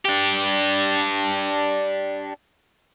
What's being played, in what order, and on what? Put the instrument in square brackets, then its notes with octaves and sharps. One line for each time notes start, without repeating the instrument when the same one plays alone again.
[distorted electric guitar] D4 G4